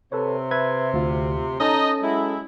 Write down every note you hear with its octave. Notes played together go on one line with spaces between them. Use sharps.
C3 A4 B4 C#5
B4 E5 G#6
D2 F4
C#4 D#4 A4 D#5 A5
F#3 G#3 E4